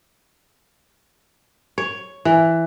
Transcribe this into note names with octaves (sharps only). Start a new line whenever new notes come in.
C#5
E3